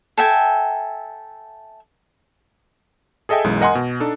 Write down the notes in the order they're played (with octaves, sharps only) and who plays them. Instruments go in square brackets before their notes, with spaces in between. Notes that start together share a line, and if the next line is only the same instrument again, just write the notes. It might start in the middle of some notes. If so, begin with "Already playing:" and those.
[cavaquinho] A4 E5 G5 G#5
[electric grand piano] G#4 A4 D#5 E5 G5 G#5
B1 F#2 E3 G#3
A#4 D#5 F#5 G#5 C6
B2
D4 D#4 A4